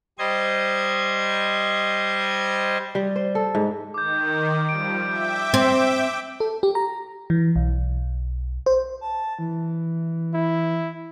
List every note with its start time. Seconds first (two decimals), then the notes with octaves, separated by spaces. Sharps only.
0.19 G3 C5 D#5 G#6
2.95 G3
3.16 C5
3.35 A4
3.55 G#2
3.94 D#3 D6 G6
4.69 F3 G3 D7
5.06 E5 G5 D6
5.54 C4 E6 B6 E7
6.40 A4
6.63 G4
6.75 A#5
7.30 E3
7.56 B1
8.66 C5
9.01 A5
9.39 E3
10.34 E4